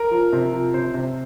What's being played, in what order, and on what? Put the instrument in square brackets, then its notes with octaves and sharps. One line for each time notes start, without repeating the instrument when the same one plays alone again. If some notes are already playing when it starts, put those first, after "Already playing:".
Already playing: [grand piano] A#4
F3
C3
F3
C3 C5
C3